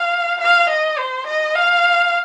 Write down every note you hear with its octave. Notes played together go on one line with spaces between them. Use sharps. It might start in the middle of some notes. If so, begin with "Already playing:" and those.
Already playing: F5
F5
D#5
C5
D#5
F5